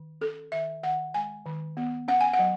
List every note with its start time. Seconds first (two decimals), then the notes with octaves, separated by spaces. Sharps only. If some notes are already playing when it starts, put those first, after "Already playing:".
Already playing: D#3
0.21 C#4 A4
0.52 D#3 E5
0.83 D#3 F#5
1.14 G#3 G#5
1.46 D#3
1.77 B3
2.08 C#4 F#5
2.21 G#5
2.34 F#5
2.39 F#3